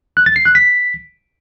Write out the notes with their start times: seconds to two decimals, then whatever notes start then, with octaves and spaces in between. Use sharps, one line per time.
0.17 F#6
0.26 A6
0.36 C7
0.45 F#6
0.55 B6